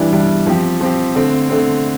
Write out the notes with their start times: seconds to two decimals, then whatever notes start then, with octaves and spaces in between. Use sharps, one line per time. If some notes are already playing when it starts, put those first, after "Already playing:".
Already playing: E3 G3 D4
0.12 E3 G3 D4
0.47 F3 C4 G4
0.81 F3 C4 G4
1.15 D3 A3 C4
1.50 D3 A3 C4